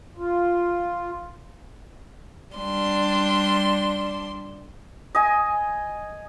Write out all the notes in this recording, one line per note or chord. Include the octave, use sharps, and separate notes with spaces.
F4
G3 D4 C6
D#5 G#5